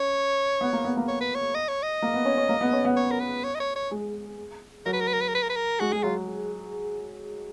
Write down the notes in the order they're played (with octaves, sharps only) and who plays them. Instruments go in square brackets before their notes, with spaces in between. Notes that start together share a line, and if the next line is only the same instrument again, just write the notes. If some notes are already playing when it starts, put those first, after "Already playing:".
Already playing: [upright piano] C#4 [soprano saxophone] C#5
[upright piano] B3
A#3
B3
A#3
[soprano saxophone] C#5
B4
C#5
D#5
C#5
D#5
[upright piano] A#3
B3
C#4
C#4
A#3
B3
C#4
B3
[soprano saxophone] C#5
A#4
B4
C#5
D#5
C#5
C#5
[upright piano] G#3
[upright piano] F#3 [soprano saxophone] A#4
[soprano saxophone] B4
A#4
B4
A#4
B4
A#4
B4
A#4
B4
A#4
[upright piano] G#3 [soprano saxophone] F#4
[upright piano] G#3 [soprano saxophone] G#4
[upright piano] F#3 [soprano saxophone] F4